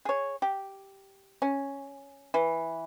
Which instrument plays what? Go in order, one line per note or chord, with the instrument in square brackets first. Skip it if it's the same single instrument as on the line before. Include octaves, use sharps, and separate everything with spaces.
[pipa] G#4 C#5
G4
C#4
E3